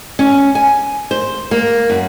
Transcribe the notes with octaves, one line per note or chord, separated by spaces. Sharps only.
C#4
G#5
C5
A#3
F#2